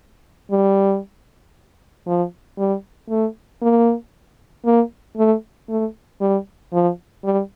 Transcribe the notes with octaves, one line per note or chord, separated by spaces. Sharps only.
G3
F3
G3
A3
A#3
A#3
A3
A3
G3
F3
G3